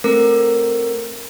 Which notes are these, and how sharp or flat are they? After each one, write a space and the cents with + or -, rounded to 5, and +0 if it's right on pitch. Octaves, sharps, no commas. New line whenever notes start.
A3 +0 C4 +15 A#4 +0